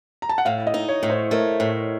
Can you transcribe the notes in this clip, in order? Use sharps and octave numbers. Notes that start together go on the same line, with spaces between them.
A#5
A5
F#5
A2 F5
D#5
D#4
C#5
A2
C5
A3 A#4
A2